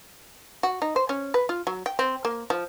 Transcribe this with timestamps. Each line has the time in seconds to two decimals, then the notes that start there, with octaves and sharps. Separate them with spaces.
0.63 F#4
0.82 D#4
0.96 C5
1.09 C#4
1.34 B4
1.49 F4
1.67 F#3
1.86 G5
1.99 C4
2.25 A#3
2.50 F3